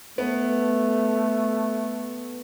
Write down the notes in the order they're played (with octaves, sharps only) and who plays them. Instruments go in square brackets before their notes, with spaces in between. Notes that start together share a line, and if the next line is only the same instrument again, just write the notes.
[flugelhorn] A3 [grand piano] B3